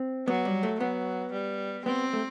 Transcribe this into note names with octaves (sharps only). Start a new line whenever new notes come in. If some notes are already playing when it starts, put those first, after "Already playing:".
Already playing: C4
F#3 B3
G3
A3
F#3 B3
G3
B3 C4
A3